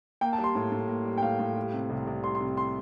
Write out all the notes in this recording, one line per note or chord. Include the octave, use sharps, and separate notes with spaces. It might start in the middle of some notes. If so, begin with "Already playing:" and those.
A#3 G5
A5
G3
C6
A2
A2
A#3
G3
G5
A2 F5
A2
G3
C3
C2
C2
G3 C6
C6
C3
C6